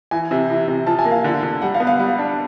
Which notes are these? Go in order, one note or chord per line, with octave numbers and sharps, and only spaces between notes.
E3 G#5
C3
E3
C3
F3 A5
G#5
A#3
F5
D3
D3
G3 F#5
F5
B3
F5
G3
D4